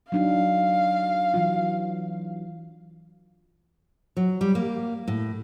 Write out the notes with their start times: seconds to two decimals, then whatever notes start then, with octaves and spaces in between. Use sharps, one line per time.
0.12 F#3 D4 D#4 F5
1.34 E3 F#3 F4
4.17 F#3
4.41 G3
4.55 A#3
5.08 A2